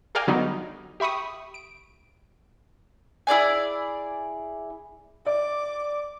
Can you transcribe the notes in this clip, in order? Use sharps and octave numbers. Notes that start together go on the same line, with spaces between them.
G#4 A#4 D5 F5 G5 G#5
D3 F#3 G3 B3 D#4
G4 E5 B5 C#6 D#6
D7
E4 G#4 D5 G#5
D5 D6